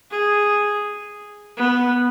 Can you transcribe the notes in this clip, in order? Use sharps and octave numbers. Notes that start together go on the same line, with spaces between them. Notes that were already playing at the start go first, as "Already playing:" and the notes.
G#4
B3